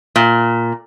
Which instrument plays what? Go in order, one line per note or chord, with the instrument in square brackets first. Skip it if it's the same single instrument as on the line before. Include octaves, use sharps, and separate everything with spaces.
[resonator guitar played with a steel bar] A#2